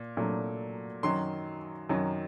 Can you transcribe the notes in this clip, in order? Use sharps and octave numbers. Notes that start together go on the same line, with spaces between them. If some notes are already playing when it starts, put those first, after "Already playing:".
Already playing: A#2
A#2 F#3 A3 D4
F#2 D#3 F#3 C6
F#2 D#3 F#3